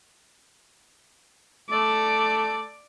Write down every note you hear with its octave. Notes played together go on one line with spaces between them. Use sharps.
A3 D5